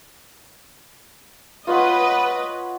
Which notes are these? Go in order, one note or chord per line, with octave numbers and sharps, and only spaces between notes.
F4 B4 C#5 D#5 F#5